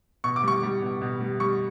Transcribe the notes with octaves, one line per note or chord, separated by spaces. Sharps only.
B2 C#6
D6
G3 C#6
G3
B2
B2
G3
G3 C#6